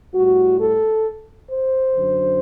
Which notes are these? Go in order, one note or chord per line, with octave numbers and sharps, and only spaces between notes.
A2 G3 F#4
A4
C5
F#2 D3 F#3